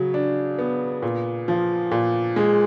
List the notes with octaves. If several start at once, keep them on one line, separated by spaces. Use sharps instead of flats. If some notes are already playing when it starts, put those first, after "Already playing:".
Already playing: C#3 F#3
D4
B3
A#2
F3
A#2
G#3